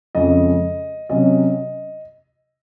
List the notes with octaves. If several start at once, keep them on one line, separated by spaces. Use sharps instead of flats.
F2 C#3 G#3 D#5
C3 F#3 C#4 D#5